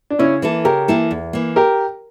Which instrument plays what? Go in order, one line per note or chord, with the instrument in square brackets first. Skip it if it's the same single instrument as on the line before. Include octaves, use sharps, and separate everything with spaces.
[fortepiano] D4
[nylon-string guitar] C#3 [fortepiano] C#4 E4
[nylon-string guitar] E3 A#3 E4 A4
[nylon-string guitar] C#3 [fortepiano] G4 A#4
[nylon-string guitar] E3 A#3 E4 A4
E2
E3 A#3
[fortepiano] G4 A#4